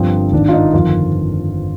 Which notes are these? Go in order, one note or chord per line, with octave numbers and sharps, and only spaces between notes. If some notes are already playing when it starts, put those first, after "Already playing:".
Already playing: G1 G2 D3 F3 C4
G#1 G#2 D#3 D4
F4
D#4
G1 F2 D#3 F4